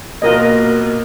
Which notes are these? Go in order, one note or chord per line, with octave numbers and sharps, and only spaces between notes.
B2 A#3 F4 A#4 D#5